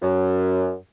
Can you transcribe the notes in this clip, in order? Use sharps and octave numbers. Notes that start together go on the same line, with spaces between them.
F#2